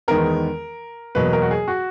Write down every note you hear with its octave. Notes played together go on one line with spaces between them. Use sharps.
E2 D#3 G#3 B3 A#4
E2 B2 F#3 A#3 B4
A#4
F#4
G#4
F#4